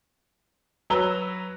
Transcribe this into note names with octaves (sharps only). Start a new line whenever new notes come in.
F#3 B4 A#5 E6 G7